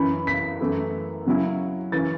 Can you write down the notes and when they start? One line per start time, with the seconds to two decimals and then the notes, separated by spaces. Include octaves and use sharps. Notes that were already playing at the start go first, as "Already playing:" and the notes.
Already playing: F#2 E3 C#4 B5
0.27 B6
0.61 F#2 E3 A3 E4
1.26 C#3 F#3 C#4 E4
1.92 E3 C#4 A6